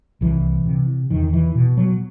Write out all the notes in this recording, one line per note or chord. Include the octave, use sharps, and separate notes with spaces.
C2 E3
C3
E2 D#3
E3
B2
F#3